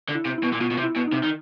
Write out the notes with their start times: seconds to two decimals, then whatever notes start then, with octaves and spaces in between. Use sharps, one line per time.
0.09 D3
0.15 E4
0.25 C3
0.38 E4
0.43 B2
0.53 A#2
0.61 B2 F4
0.71 B2
0.78 C3
0.83 E4
0.96 B2
1.07 D#4
1.12 C3
1.24 D#3